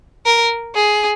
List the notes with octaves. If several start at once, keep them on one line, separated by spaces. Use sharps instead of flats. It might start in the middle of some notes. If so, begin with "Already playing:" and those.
A#4
G#4